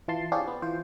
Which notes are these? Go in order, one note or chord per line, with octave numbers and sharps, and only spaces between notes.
E3 F4 A5 C6
C4 D4 F4 G4 G#4 C#5
B3
E3 F4 C5